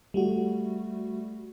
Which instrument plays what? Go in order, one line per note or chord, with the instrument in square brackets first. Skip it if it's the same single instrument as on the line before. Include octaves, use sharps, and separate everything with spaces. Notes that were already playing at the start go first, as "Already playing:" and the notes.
[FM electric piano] G3 A3 F#4